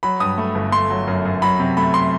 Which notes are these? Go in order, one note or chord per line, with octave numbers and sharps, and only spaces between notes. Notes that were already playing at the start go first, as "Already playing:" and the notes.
F#3 B5
G2 D#6
A3
G1
A3 C6
F#3
F#2
F#2
F#3 B5
C3
A3 B5
C6